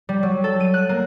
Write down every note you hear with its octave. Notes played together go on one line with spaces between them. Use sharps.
G3
F#3
A4
D#7
F#6
A#3